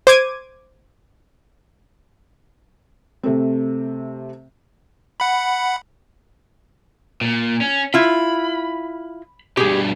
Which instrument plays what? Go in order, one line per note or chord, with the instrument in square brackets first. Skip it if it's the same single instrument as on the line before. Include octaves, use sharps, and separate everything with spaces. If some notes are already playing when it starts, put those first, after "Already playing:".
[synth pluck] C5 D6 G#6 D#7
[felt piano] C3 A3 C4
[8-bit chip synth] F#5 B5
[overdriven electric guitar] A#2
C#4
[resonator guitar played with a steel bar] E4 F4 [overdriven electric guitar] B5
[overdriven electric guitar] G2 B2 [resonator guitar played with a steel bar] G4 G#4